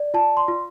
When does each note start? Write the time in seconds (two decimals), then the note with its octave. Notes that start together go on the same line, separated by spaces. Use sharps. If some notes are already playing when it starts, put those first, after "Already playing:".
Already playing: D5
0.14 F4 A5
0.37 C6
0.48 F4